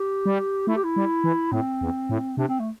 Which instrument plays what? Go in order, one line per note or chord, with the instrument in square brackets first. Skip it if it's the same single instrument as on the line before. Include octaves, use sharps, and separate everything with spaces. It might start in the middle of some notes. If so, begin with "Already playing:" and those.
Already playing: [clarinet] G4
[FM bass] G3
[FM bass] A3 [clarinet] E4
[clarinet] G4
E4
[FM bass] G3
E3
[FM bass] A2 [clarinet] C4
[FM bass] E2
A2
[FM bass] C3 [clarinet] D4
[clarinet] C4
A3